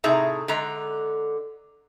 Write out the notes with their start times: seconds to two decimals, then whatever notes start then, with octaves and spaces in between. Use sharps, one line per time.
0.04 A2 C3 D#4 G#4 E5 A#5
0.48 D3 G#3 A#5